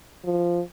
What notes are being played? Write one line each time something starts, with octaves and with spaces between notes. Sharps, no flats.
F3